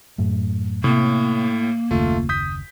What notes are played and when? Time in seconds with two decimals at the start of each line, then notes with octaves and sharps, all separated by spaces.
0.18 F#2 A2
0.84 A2 C3 A#3 B3
1.91 F#1 D#2 C#3 A3 F4
2.29 D#6 G6 B6